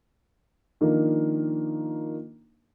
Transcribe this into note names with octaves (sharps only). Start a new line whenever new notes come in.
D#3 F3 A#3 D4 D#4